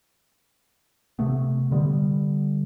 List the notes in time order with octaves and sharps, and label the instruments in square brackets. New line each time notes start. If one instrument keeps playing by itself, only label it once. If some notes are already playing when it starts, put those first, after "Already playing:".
[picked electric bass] C3 A3 B3
D3 G3 B3